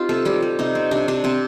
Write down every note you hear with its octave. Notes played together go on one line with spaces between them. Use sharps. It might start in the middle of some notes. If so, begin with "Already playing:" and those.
Already playing: C4 D#4 F4 G4
C3 A4
G3 G4
G3
C3 D#4
C4
C3 D4
C3 D4
C3 C4